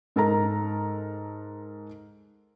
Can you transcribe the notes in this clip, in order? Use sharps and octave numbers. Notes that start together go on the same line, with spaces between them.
G#2 A4 A#4 A#5